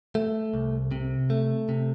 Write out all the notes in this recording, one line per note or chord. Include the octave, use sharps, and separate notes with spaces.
A3
C2
C3
A3
C3